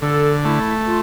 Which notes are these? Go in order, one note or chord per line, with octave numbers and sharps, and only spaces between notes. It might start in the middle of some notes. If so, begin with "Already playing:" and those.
D3 A4
A3 E4
F4